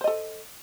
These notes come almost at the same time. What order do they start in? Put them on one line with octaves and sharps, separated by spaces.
C5 D#5 A4